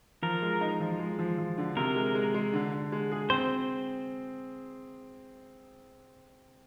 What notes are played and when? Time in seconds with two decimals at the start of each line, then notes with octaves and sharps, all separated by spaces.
0.22 F3 A#4
0.42 G#3
0.61 D#4
0.80 F3
0.99 G#3
1.19 F3
1.38 F3
1.58 D3
1.76 C3 A#4
1.96 G#3
2.15 G#3
2.34 G#3
2.54 D3
2.73 D3
2.92 G#3
3.12 G#4
3.30 C4 C5